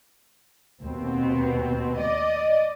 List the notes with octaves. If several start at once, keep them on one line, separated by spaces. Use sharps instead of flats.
D#2 B2 C4
D5 D#5